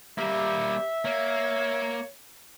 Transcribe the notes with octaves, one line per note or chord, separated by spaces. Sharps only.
G3 A#3 G4 E5
A#3 C#5